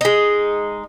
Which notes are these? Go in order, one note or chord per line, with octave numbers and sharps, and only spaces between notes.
G#3 D#4